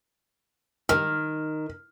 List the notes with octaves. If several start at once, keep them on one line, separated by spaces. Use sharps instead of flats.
D#3 F6